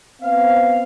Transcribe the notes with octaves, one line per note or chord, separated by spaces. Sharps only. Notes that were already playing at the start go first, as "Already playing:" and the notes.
B3 C4 F5